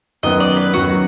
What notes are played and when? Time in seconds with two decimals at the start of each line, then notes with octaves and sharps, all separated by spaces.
0.23 F#2 D#3 F#3 B3 D#5
0.40 D5
0.57 B4
0.73 F#2 D#3 F#3 B3 F#4